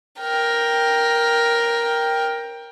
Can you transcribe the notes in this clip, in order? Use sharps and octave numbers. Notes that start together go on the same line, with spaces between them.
A#4 G5